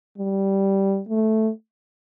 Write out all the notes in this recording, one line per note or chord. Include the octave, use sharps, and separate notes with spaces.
G3
A3